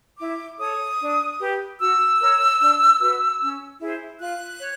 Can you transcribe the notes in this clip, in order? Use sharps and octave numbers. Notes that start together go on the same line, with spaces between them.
E4 D6
A4 C#5 D#6
D4
G4 B4
F#4 E6
A#4 C#5
D4
F#4 B4
C#4
E4 G#4 C5
F4 F#6
C#5